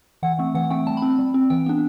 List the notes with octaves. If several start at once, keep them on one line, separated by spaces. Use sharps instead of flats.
E3 F#5
A3 C4
E3 F#5
A3 C4 G5
G3 A5
B5
C4
G3
C4
E3 G5
B3 D4